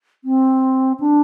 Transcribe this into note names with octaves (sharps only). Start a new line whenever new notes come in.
C4
D4